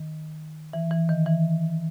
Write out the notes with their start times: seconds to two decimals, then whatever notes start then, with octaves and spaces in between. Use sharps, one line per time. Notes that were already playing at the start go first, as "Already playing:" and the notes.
Already playing: D#3
0.73 E3
0.91 E3
1.09 D#3
1.26 E3